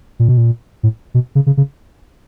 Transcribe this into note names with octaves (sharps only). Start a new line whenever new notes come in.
A#2
B2
A#2
A2
B2
C#3
C#3
C#3